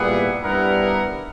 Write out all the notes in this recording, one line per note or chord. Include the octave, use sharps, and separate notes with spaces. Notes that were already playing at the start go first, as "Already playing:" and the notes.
Already playing: A#2 G3 B3 E4 G#4
G2 G3 B3 E4 A#4